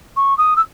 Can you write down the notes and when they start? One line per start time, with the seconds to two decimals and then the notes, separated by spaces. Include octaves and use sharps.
0.16 C#6
0.38 D#6
0.56 E6